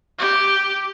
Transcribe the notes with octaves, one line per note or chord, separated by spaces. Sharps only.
G4